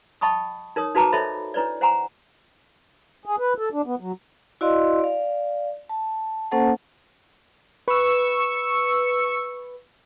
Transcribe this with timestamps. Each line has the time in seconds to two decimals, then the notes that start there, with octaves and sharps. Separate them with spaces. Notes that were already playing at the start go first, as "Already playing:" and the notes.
0.21 D#5 G5 A5 B5 C#6 D#6
0.76 D#4 A#4 C#5 D#6
0.95 D#4 F#4 B4 A5 A#5 D6
1.12 A4 C5 C#5 D#5 E5 B5
1.54 D4 E4 B4 C#5 D5
1.81 C5 F#5 G#5 A#5 C6
3.26 G#4
3.39 B4
3.58 A4
3.73 D4
3.86 B3
4.00 F#3
4.61 E4 F#4 D5 D#5 F5 C6
5.00 D5 F5
5.89 A5
6.51 A#3 C#4 A4 C5 F#5 A5
7.88 B4 C#6 E6